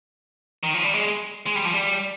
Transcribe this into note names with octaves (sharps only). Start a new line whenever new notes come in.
D#3
F3
G3
G#3
G#3
G3
F3
G3